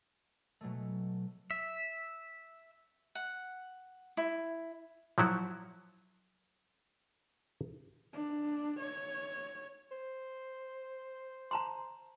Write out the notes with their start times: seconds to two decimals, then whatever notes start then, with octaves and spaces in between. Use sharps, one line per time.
0.61 B2 F#3 G#3 A3
1.51 E5
3.15 F#5
4.17 E4
5.18 F3 F#3 E4 F#4
8.13 D4
8.80 C#5
9.91 C5
11.51 A5 A#5 C6